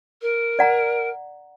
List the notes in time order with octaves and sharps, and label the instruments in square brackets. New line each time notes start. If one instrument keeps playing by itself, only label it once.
[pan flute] A#4
[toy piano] D5 F#5 A#5